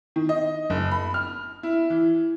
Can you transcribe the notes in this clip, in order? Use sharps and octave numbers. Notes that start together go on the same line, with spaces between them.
D#3
D#5
F#1
B5
F6
E4
E3